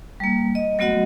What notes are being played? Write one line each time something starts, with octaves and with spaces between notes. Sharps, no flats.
G3 A#3
D#5
F#3 A3 B3 F#4 D#5 F#5